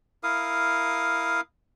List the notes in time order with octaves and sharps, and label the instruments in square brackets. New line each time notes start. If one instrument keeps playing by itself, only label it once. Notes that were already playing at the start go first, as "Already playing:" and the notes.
[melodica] E4 A#4 F5 D#6